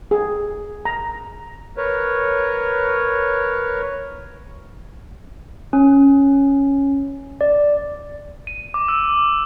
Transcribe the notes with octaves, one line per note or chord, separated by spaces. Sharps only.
G#4
A#5
A#4 B4 C#5
C#4
D5
D#7
D6
E6